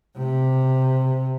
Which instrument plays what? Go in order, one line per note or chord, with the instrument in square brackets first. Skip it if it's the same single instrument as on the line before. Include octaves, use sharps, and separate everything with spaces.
[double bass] C3